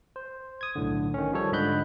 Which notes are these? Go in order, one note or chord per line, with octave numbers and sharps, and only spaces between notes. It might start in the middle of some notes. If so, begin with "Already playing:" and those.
C5
D#6 G#6
B1 A2 D3
D#3 C#4
F3 G3 A4 C#5
G#2 D3 D#5 B5 F#6 G6